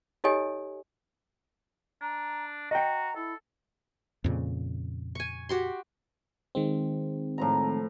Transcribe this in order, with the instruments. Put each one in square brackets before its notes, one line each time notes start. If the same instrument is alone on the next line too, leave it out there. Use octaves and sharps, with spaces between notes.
[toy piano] D#4 G4 A4 C#5 D#5 G#5
[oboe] D4 [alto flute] A#5
[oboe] F#4 [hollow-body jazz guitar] D#5 G5 [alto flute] A#5
[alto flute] E4 [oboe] A4
[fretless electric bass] F2 A#2 C#3
[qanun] G#5 C#6
F#4 G4 C6
[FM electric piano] D#3 G#3 C4
[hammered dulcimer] A2 F3 A#5